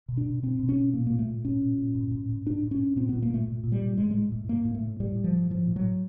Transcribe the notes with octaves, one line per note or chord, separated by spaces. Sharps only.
B2
D4
B2
B2 C4
B2
C#4
B2
A#2 A#3
A#2 A#3
A3
A#2
A#2 C#4
A#2
A#2
A2
A2
A2
A2 D4
A2
C#4
A2
A#2 C4
A#2 B3
A#3
A#2 A3
A#2
A#2
G3
A#2
A2 G#3
A2 G#3
A2
A2 A#3
A2
A3
A2
A2 G3
A2
F3
A2
A2 F3
A2
F#3
A2